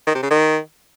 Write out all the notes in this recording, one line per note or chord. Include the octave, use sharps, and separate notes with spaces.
D#3
C3
C#3
D#3